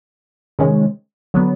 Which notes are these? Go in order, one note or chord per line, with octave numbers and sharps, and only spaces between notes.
C3 D#3 G#3 C#4
D3 F#3 B3